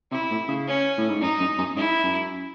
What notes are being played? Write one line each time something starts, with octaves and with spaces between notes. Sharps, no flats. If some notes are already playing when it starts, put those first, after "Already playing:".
C3 E4
A2
C#3
C#4
A2
G#2
F#2 D#4
F#2
F#2
G#2 E4
F#2